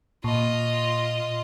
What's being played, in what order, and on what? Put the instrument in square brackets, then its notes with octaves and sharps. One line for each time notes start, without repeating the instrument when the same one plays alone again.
[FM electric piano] A#2 [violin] F4 D#5